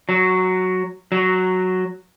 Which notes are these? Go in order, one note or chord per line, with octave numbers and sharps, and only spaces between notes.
F#3
F#3